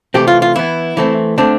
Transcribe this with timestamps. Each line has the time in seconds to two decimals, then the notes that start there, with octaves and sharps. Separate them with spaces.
0.14 C3 E3 A3 C4 G4
0.28 F4
0.42 F4
0.55 E3 B3 E4
0.97 E3 A3 C4
1.38 D3 A3 C4 D4